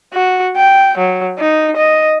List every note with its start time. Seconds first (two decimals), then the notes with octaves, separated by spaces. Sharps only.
0.13 F#4
0.56 G5
0.98 F#3
1.39 D#4
1.77 D#5